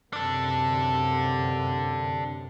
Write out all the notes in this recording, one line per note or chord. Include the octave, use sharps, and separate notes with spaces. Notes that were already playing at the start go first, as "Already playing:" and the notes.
F#2 C3 D4 A4